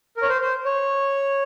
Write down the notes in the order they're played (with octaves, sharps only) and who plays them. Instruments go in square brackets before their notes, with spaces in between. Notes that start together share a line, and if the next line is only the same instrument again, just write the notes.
[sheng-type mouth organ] A#4
C#5
C5
C5
C#5